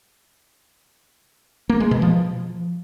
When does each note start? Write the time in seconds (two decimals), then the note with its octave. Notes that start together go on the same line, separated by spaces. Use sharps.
1.69 A#3
1.80 G#3
1.91 B2
2.02 F3